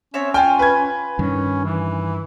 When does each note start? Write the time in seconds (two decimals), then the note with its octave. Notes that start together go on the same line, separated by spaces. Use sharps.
0.14 C4 C#4 C#5 E5
0.34 F4 G5 G#5 F6
0.59 B4 G#6
1.19 G2 D#3 C#4
1.65 E3